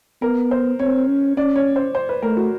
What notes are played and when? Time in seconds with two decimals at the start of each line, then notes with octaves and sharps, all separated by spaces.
0.22 B3 A#4
0.51 C5
0.80 C4 C#5
1.08 C#4
1.37 C#4 D5
1.56 C#5
1.76 C5
1.95 C5
2.09 B4
2.22 A3 A#4
2.37 F#4